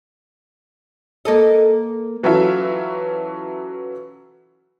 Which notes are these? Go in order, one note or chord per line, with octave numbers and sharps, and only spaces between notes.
A#3 A4 D#5
E3 F#3 C#4 F4 A4 E5